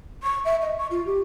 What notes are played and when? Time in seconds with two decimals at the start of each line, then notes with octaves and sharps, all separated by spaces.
0.23 C#6
0.45 E5
0.62 D#5
0.78 C#6
0.91 F4
1.06 G4